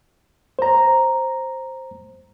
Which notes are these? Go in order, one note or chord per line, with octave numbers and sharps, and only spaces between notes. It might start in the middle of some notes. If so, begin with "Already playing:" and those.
C5 A#5